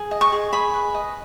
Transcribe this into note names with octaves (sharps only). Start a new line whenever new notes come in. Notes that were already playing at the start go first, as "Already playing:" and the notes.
Already playing: G#4
D#5
C#6
G#4
G#4 B5
B4
D#5